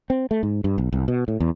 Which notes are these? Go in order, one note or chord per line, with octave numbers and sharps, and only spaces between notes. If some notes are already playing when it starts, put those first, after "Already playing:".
C4
A3
G#2
G2
B1
C2
B2
A2
E2